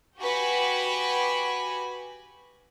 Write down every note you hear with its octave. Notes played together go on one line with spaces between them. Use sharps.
F#4 G4 B4 G#5